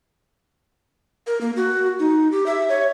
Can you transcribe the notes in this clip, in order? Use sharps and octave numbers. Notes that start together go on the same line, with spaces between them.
A#4
A#3
F#4
D#4
G4
E5
C#5